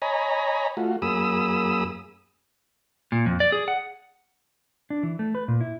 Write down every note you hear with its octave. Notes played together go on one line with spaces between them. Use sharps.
C#5 D#5 G#5 A#5 B5
A3 F4 F#4
F#2 A#3 G#4 B5 D#6 E6
A#2
F2
D5
G#4
F#5
D4
E3
A3
B4
A#2
E4